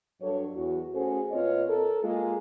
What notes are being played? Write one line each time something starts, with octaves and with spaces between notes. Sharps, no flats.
G2 F#3 D4 A4 C#5
E2 F#4
A3 C#4 F#4 G#4 A4 C5
A#2 C4 F4 B4 C#5 D#5
A4 A#4
G#3 A#3 F4